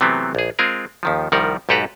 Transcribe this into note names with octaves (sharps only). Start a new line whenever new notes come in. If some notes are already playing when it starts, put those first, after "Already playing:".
C3 E3 F#3 A3 B3 C4
A#1 G#4
G#3 C4 F4 G#4 A#4
D#2 D#3 F3
C2 D#3 F3 G3 A#4 F#5
B1 G#2 G4 A4 B4 A#5